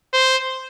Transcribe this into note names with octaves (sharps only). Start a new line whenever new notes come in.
C5